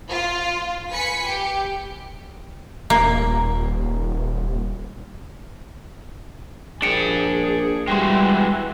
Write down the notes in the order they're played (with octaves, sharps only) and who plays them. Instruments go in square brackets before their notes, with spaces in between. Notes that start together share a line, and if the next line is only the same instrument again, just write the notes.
[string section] F4
B4 G#5 B6 C#7
G4
[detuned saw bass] D#1 [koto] A#3
[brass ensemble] A#1 [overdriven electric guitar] D4 G5 [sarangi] G#4 [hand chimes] C#7 D7
[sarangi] E3 [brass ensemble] G3 [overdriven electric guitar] G#3 F#4 [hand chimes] G5 C6